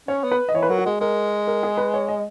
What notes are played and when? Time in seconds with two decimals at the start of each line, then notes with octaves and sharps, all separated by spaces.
0.08 C#4 C#5
0.24 B3
0.31 B4
0.49 D#5
0.54 E3 C#5
0.62 B4
0.70 F#3 A#4
0.78 F#4
0.86 G#3 G#4
1.01 G#3 A#4
1.47 A#4
1.63 G#4
1.77 B4
1.94 C#5
2.08 D#5